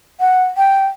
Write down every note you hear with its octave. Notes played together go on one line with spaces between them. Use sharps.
F#5
G5